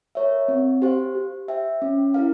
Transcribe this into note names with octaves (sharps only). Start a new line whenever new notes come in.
A#4 C#5 E5
C4
G4 C5 F5
G4
C5 E5 G5
C#4
E4 A#4 F5